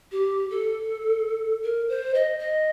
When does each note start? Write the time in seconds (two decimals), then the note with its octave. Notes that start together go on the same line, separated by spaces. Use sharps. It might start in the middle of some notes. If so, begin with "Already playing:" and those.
0.12 G4
0.51 A4
1.64 A#4
1.89 C5
2.15 D#5
2.39 D#5